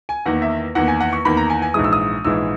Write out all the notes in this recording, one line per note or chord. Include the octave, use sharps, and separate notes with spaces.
G#5
E2 D#3 A#3 F#5
E5
E2 D#3 A#3 F#5
G#5
F#5
C#6
E2 D#3 A#3 B5
A#5
G#5
G#5
A#1 G#2 E3 G#3 D#6
E6
D#6
A#1 G#2 E3 G#3 E6